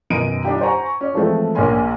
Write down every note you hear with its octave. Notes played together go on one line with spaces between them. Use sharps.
F#2 B2 D#3 D#5 D7 D#7
G3 D4 D#4 G4
C5 F#5 G#5 A#5 C#6
C#4 D5
E3 F3 G#3 A3 C4
A#1 A#3 A#4 C#5 G#5 C6